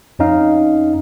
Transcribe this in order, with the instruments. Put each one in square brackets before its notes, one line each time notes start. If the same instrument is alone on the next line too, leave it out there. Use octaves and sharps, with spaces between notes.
[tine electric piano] F2 C#4 D#4 F5